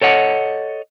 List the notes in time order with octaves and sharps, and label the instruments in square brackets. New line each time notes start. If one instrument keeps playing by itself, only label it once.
[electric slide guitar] A4 C#5 D#5 F#5